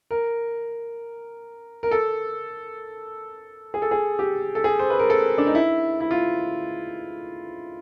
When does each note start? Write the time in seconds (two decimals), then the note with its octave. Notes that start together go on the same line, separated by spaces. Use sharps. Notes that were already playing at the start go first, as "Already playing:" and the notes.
0.11 A#4
1.83 A#4
1.91 A4
3.74 G#4
3.82 A4
3.91 G#4
4.19 G4
4.55 A4
4.64 G#4
4.79 C5
4.90 B4
4.99 A#4
5.10 A4
5.38 D4
5.47 D#4
5.55 E4
6.01 E4
6.11 F4